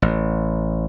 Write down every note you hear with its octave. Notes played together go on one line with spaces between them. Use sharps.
A1